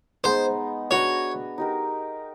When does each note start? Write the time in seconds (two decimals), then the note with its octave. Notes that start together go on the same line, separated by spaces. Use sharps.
0.24 G#3 B3 D#4 C5
0.91 D4 F#4 B4 C#5
1.58 D#4 G4 A#4